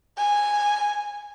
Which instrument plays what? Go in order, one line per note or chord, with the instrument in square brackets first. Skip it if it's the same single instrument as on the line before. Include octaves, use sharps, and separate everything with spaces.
[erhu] G#5